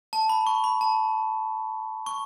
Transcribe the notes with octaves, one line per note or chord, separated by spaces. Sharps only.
A5
B5
C#6
B5
A5
C#6